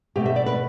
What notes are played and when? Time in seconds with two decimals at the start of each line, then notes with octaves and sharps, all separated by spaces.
0.16 B2 A3 G4
0.26 E5
0.36 D5
0.46 B4